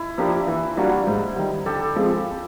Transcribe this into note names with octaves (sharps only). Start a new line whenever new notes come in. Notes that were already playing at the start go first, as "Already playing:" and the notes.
Already playing: E4
F3 A#3 D4 G4
E3
G3 A#3 D4 F#4
G#2
D#3 G3
D3 G4 A4
F3 G#3 C4